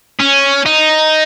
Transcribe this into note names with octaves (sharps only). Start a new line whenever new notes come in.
C#4
D#4